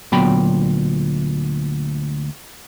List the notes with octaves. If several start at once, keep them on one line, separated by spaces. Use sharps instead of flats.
D2 A#2 F#3 B3 G5 B5